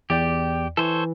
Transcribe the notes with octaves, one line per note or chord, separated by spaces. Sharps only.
E2 G4 D5 G5
E3 A4 C5 C#5